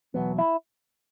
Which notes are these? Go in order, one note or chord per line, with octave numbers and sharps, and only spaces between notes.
E2 B2 F#3 B3
E4